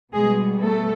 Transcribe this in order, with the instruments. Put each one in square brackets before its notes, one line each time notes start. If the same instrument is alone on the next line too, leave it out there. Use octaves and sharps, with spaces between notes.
[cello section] B2 G3 G#3 B3 G#4
A3 A4